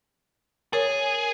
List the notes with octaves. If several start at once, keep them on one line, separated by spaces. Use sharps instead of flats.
G#4 A#4 C#5